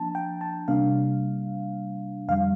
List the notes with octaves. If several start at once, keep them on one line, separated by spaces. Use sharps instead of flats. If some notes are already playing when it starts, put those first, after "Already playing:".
Already playing: F3 A#3 D4 A5 A#5
G5
A5
C3 G3 A#3 D4 F5
F2 D3 G3 F5